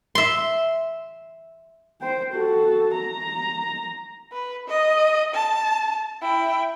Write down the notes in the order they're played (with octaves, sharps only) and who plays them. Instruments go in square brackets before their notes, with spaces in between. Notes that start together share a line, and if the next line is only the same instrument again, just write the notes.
[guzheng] E5 C6
[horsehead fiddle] C5 G5
F#4 A4
A#5
[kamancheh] B4
D#5
A5
E4 G5